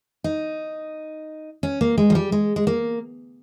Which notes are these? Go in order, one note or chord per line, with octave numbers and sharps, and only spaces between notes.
D#4
C#4
A#3
G#3
F3
G3
G#3
G#3
A#3